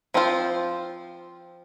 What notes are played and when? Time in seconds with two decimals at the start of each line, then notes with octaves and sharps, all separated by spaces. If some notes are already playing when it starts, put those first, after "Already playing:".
0.14 F3 C4 F4 C5